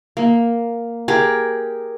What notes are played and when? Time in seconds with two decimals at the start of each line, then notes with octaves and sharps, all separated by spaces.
0.17 A#3
1.08 G4 G#4 A#4